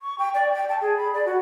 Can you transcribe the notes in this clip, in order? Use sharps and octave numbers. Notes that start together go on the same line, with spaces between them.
C#6
G5
D5
G5
A5
G#4
B5
D5
F#4